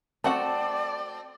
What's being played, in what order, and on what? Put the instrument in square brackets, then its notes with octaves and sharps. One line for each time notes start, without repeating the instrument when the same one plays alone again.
[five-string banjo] A3 F#4 F#5 [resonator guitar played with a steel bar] C4 [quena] D5 [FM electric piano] A5